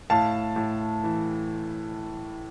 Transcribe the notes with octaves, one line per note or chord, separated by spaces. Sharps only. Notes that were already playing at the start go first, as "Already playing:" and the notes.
A2 F5 A5
A2
E3